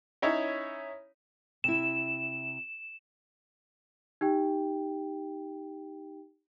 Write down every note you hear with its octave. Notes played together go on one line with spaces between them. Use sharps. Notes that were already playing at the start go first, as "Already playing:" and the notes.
C#4 D#4 E4 C#5
C3 E4 E7
D#4 G4 G5